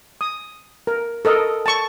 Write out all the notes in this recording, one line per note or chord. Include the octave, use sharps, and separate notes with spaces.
D#6
A#4
A4 A#4 D#5
A5 C#6